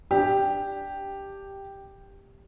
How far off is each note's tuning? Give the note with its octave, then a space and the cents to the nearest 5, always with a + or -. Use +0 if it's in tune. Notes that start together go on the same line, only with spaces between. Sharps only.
D4 +0 G4 +0